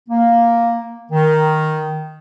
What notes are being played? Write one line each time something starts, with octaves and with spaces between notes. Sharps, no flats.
A#3
D#3